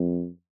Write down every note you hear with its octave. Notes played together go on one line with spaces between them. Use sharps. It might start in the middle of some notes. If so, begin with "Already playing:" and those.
Already playing: F2